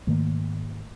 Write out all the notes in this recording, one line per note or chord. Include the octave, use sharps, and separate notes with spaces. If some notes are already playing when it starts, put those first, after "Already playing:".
G#2 D#3 A3 A#3